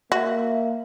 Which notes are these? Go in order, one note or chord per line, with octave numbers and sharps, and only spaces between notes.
A#3 F#4 E5